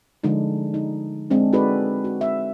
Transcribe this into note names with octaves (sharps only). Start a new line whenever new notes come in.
D3 F3 G#3 D4 D#4
D#4
G#3 C4 D4
D#4 F#4 G#4 A4 B4 D5
F#4
E5